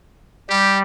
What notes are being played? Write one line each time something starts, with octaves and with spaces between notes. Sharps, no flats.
G3 G4